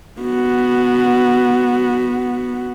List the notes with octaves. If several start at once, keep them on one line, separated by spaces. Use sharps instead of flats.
B3 F#4